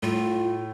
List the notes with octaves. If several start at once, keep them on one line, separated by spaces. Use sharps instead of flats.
A2 F4